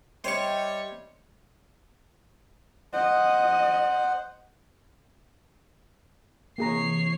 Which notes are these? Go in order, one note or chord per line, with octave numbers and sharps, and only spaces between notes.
G3 C5 C#5 D#5 E5 G5 C#6
C5 D#5 F#5
C3 E3 A#3 G#4 C#5 A#5 C7